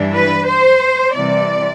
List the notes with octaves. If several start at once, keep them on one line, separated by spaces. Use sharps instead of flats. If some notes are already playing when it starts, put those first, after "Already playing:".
Already playing: G2 E3 G3 D4
B4
C5
C3 E3 G3 D5